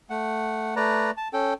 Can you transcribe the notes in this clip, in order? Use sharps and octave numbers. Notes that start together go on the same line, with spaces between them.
A3 F#5
A3 B4 D5 A#5
A5
C#4 A4 G5